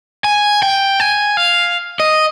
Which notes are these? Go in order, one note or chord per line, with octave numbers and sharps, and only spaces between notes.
G#5
G5
G#5
F5
D#5